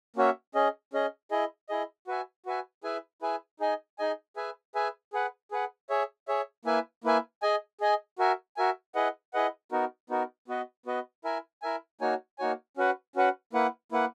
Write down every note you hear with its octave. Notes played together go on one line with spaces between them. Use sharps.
A#3 C#4 F#4 C#5 E5
C#4 G#4 D#5
C#4 G#4 D#5
E4 G#4 D#5
E4 G#4 D#5
F#4 B4 E5 G#5
F#4 B4 E5 G#5
E4 G#4 B4 E5 G#5
E4 G#4 B4 E5 G#5
D#4 G#4 D#5 G#5
D#4 G#4 D#5 G#5
G#4 B4 E5 G#5
G#4 B4 E5 G#5
G#4 B4 F#5
G#4 B4 F#5
G#4 C#5 E5
G#4 C#5 E5
A#3 E4 B4 E5 G#5
A#3 E4 B4 E5 G#5
G#4 D#5 G#5
G#4 D#5 G#5
F#4 A#4 E5 G#5
F#4 A#4 E5 G#5
E4 G#4 B4 D#5 F#5
E4 G#4 B4 D#5 F#5
B3 D#4 F#4 A#4
B3 D#4 F#4 A#4
B3 F#4 B4 D#5
B3 F#4 B4 D#5
E4 A#4 E5 G#5
E4 A#4 E5 G#5
A#3 D#4 F#4 C#5 G#5
A#3 D#4 F#4 C#5 G#5
C#4 F#4 B4 F#5
C#4 F#4 B4 F#5
A#3 E4 B4 F#5
A#3 E4 B4 F#5